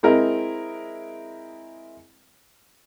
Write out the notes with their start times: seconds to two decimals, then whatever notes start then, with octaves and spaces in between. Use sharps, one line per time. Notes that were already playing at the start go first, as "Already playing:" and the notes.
0.03 G#3 C4 E4 A#4 D#5 E5